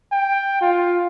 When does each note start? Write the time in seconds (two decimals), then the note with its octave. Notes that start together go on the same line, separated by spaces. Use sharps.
0.12 G5
0.61 F4